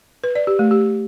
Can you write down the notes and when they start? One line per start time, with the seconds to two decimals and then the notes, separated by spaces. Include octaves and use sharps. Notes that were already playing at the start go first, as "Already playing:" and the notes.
0.24 B4
0.35 D5
0.47 G4
0.59 A3
0.71 G4